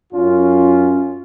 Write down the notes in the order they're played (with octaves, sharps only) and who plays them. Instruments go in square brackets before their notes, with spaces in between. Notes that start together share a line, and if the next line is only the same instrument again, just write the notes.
[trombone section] F#2 C#4 F4